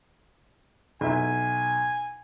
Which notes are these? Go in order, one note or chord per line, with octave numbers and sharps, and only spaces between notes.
B1 E5 G#5